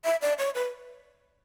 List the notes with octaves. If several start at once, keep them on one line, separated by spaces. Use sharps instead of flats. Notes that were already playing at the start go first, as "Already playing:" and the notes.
E5
D5
C#5
B4